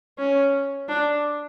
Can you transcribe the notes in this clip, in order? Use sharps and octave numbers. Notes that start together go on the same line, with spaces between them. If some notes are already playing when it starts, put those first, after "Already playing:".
C#4
D4